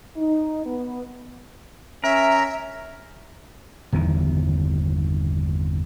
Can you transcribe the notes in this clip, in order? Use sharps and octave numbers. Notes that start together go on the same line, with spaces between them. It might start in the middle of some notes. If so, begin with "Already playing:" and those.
D#4
B3
C#4 A#4 E5
G1 E2 D#3 E3